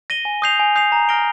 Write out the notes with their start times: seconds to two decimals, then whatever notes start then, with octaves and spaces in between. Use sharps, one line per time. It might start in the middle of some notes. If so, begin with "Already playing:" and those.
0.10 A#6 D#7 G7
0.25 G#5
0.42 D#6 G6 C7 F7
0.59 G#5
0.76 D#6 G6 C7 F7
0.92 A#5
1.09 F6 A#6 D7 G7